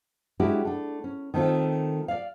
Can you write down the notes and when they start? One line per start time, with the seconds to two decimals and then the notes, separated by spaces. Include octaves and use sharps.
0.40 G#3 C#4 D4 E4 F#4 G4
0.65 A3 D4
1.04 C#4
1.34 D#3 A3 C4 F4
2.08 D5 F5